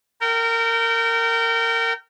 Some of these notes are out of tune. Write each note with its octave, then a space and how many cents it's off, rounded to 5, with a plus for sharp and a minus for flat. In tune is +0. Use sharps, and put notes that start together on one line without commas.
A#4 -25 G5 -30